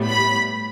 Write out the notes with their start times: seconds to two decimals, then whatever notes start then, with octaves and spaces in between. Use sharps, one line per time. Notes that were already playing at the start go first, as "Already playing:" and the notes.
Already playing: A2 G3 B3
0.08 B5